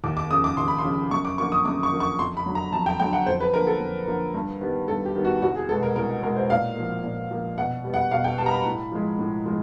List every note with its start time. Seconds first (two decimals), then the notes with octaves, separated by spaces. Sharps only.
0.04 D#2 D6
0.17 D6
0.30 C#3 F3 D#6
0.44 D6
0.57 D#2 C6
0.68 B5
0.79 C6
0.84 C#3 F3
1.11 F#2 C#6
1.25 D6
1.38 D3 F3 A#3 C#6
1.52 D#6
1.65 F#2 D6
1.83 C#6
1.92 D3 F3 A#3
2.00 C#6
2.19 F2 C6
2.37 B5
2.46 D3 F#3
2.55 A#5
2.72 F2 A5
2.86 G5
3.00 D3 F#3 G5
3.13 F#5
3.26 F2 C5
3.40 B4
3.53 D3 F3 A#3 A#4
3.67 A4
3.80 F2
4.07 D3 F3 A#3
4.34 G2
4.61 D#3 G3 B3
4.88 G2 A4
5.06 G4
5.15 D#3 G3 B3
5.24 F#4
5.42 C2 F#4
5.56 G#4
5.69 B2 G#3 B3 A4
5.83 A#4
5.95 C2 A#4
6.23 B2 G#3 B3 A#4
6.37 C5
6.50 A#2 F5
6.76 F3 A#3
7.03 A#2
7.31 F3 A#3
7.58 B2 F#5
7.84 G3 B3
7.94 F#5
8.11 B2 F5
8.24 G5
8.38 G3 B3 A5
8.46 A#5
8.51 B5
8.65 A2
8.92 F3 G#3
9.19 A2
9.46 F3 G#3